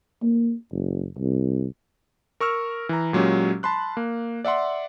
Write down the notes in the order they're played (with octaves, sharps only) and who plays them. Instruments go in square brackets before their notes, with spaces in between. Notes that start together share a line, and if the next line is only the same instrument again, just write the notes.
[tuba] A#3
F#1
C2
[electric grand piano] A#4 C#6 E6 F6
E3 A#5
A#2 F#3 G#3 C#4 G4
A5 B5 C6 F#6
A#3
D5 E5 F#5 C6